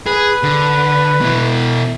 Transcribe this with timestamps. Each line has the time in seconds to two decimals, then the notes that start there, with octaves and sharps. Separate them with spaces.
0.06 G#4 B4
0.43 D3
1.21 B2 E4